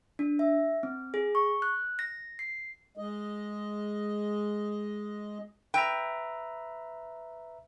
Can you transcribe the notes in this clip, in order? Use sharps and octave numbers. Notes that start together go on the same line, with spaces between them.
D4
E5
C4
G#4
C#6
F#6
A#6
C7
G#3 D#5
B4 E5 G5 A#5